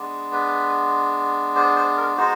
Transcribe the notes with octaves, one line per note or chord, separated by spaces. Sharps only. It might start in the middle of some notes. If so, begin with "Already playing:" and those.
Already playing: G#3 B3 D4
B4
C5
C5
A#4
G#3 B3 D#4 F#4 C5